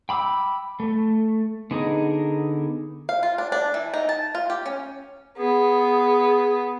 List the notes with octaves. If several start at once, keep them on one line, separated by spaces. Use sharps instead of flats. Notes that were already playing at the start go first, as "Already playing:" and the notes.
G5 B5 D6 E6
A3
D3 B3 D#4 G#4 A#4
F5
F4
D4
D4
E3
D#4
A5
F4
G4
C#4
B3 G#4